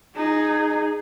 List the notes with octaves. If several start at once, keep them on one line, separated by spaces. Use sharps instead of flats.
D#4 G#4